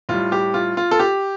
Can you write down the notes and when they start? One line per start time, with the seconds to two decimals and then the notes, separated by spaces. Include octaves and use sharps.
0.09 A2 G3 F4
0.32 G4
0.54 F4
0.77 F4
0.91 A4
1.00 G4